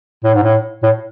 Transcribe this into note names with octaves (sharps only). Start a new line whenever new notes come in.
A2
G#2
A2
A2